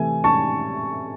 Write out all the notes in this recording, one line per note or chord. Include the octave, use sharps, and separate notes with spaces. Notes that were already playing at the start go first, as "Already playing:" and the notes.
Already playing: C3 E3 A3 G#5
A5 C#6